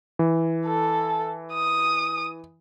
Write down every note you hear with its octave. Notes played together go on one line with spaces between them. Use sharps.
E3
A4
D#6